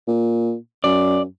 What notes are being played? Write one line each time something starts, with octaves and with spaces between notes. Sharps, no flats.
A#2
F#2 D5